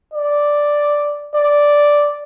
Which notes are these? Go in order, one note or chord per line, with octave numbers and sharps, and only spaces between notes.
D5
D5